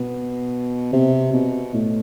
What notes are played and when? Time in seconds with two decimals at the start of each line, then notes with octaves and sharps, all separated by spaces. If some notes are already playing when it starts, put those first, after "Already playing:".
Already playing: B2
0.93 C3
1.33 B2
1.74 A2